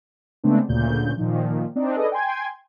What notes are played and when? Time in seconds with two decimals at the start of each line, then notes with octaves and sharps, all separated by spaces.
0.44 C#3 G#3 A3 B3 C4 D4
0.68 D2 A#2 C#3 G6
1.17 A#2 D#3 F3
1.76 C4 D4 D#4
1.96 G#4 A4 B4 D5 D#5
2.12 G5 G#5 C6 G#6